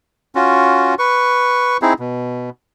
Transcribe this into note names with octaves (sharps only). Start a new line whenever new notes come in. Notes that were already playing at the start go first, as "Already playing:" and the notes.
C#4 F4 F#4
B4 C#6
C4 D#4 E4 G#4
B2